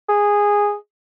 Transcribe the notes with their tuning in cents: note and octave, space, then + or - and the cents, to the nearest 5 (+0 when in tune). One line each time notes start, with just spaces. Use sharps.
G#4 -10